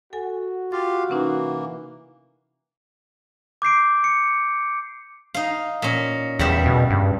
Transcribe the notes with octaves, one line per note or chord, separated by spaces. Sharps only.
F#4 A4 G#5
F4 G4 F5 A6
C3 E3 A#3 C#4 D#4
D6 G6 C7 D7
C#7
D#4 F5
A#2 C#4
E2 C#3 G3 E5
B2
G2